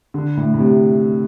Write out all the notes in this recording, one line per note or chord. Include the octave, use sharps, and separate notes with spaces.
D3
A2
A2
C3